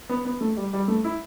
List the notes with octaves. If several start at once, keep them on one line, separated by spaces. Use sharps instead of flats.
B3
B3
A3
G3
G3
A3
E4